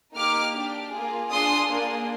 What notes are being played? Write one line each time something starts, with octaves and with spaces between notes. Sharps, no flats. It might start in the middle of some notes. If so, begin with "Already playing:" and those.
A#3 D#4 G4 D6 F6
D4 G4
A#3 F4 G#4
D4 F4 G#4 C6 D#6
A#3 D4 G#4